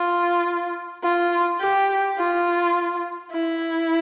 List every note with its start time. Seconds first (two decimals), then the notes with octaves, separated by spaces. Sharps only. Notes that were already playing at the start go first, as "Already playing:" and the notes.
Already playing: F4
1.03 F4
1.61 G4
2.18 F4
3.32 E4